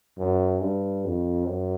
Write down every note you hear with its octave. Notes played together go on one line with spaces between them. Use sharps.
F#2
G2
F2
F#2